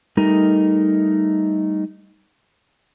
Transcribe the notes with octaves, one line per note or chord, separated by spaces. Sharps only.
G3 A3 D#4 A#4 D#5